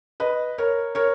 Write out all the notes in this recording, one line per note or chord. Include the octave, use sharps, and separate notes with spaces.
B4 D#5
A#4 C#5
A#4 C#5